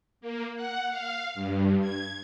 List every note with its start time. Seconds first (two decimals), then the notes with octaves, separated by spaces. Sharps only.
0.21 A#3
0.56 F#5
0.89 F5
1.35 G2
1.80 G#6